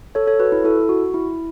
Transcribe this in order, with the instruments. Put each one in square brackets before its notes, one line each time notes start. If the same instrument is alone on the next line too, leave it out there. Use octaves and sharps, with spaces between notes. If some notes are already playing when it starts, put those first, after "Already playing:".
[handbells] A4 C#5
A4 C#5
F#4 B4
E4 A4
E4 A4
F#4
E4